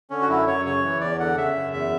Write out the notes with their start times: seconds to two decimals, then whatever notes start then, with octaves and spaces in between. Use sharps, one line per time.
0.10 D3 C#4
0.22 F#4
0.28 F#2 E4
0.46 F#2 C#5
0.65 C#3 C#5
0.84 E3
1.00 E2 D5
1.19 D3 F#5
1.37 C#3 E5
1.55 F#2
1.73 E2 E5